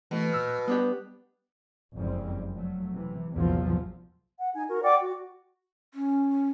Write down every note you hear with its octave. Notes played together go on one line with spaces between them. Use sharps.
B2 E3 A3
A#2 E6 F6
G3 B3 D4 G4
F#1 F2 G3 G#3 C4
F3 F#3 A3
C3 E3
A#1 E2 G#2 C3 F3 F#3
F#5
D#4 G#5
F#4 A#4
D5 F#5 G5 D6
F#4
C#4